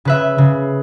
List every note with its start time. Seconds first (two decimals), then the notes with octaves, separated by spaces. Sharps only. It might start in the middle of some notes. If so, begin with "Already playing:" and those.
0.05 C#3 B4 E5
0.38 C#3